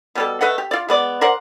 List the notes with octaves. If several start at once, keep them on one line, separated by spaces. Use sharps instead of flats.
B2 G3 A4
A3 B4 D#5 F#5
G4
F4 D5
G#3 B3 D5
A#4 C5 D5 F#5